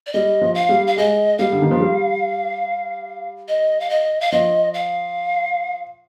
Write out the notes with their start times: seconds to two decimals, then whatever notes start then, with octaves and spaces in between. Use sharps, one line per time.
0.07 D5
0.13 G3 D#5
0.41 F3
0.55 F5
0.69 G3
0.87 F5
0.97 G#3 D#5
1.39 G3 F5
1.52 D3
1.62 D#3
1.71 F3
1.80 G3
3.48 D#5
3.80 F5
3.90 D#5
4.21 F5
4.31 F3 D#5
4.74 F5